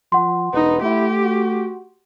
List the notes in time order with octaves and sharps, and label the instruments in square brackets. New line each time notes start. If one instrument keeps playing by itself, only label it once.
[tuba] F3 [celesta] F#5 C6
[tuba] E1 [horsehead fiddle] D#4 [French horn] B4
[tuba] A3 [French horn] E4 [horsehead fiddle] G4
[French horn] F#4